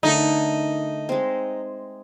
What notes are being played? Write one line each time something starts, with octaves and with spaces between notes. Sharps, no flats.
D3 A3 D#4 A#4
G#3 C4